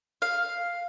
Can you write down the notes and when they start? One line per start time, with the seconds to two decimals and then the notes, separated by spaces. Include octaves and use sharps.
0.22 F5